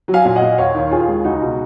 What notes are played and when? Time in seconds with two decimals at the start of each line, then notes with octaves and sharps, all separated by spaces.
0.08 F#3
0.13 F5 G#5
0.25 A#2 F5
0.36 D#5 F#5
0.41 A#2
0.58 D#2 C#5 F5
0.75 D#3
0.91 D#2 F4 G#4
1.08 G#3
1.24 C#2 D#4 F#4
1.42 B2